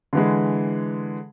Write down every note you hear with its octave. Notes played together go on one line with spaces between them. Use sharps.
D3 E3 G#3